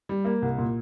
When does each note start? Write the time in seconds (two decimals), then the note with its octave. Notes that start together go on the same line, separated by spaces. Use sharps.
0.09 G3
0.25 A#3
0.42 C2
0.58 A#2